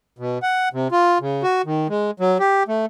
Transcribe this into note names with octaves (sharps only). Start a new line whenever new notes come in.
B2
F#5
C3
F4
C#3
F#4
D#3
G#3
F#3
G4
A3